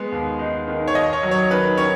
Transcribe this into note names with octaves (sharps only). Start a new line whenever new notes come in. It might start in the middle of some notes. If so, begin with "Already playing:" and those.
Already playing: G#3 B3
D#2
D#4
D#3
C#5
D#2 D#5
C#5
F#3
C#5
D#3 B4
D#3 C#5